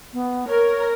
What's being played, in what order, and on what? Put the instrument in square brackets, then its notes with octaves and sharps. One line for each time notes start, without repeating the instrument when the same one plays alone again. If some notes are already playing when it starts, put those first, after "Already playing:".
[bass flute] B3
[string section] A#4 [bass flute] C#5